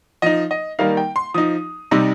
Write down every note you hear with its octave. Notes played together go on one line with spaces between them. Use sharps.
F3 D#4 D#5
D#5
D#3 G3 A#3 D#4 F5
G5
C6
F3 D#4 D#6
C3 G3 D#4